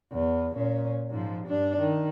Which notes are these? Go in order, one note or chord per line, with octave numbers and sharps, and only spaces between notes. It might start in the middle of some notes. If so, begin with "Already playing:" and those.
E2
A#2 C#4
G#2 F3
G2 D4
D#3